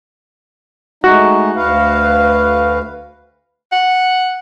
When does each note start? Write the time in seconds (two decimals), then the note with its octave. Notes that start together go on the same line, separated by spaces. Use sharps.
1.04 G#3 A3 D#4 F#4
1.56 D2 B4 F5
3.72 F#5